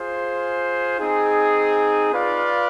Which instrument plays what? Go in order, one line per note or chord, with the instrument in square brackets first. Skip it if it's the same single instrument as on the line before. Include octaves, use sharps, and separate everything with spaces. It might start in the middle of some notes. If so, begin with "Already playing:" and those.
Already playing: [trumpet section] F4 G#4 C5
C4 D#4 G#4
F4 B4 D5 F5